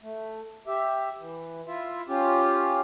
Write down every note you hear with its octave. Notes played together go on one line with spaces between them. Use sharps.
A3
G4 E5
E3
E4 F4 E5
C#4 F4 G4